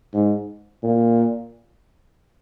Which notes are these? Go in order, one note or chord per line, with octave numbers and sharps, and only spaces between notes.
G#2
A#2